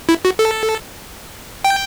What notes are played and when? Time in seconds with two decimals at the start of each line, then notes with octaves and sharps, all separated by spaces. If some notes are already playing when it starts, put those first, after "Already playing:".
0.09 E4
0.25 F#4
0.39 A4
1.64 G5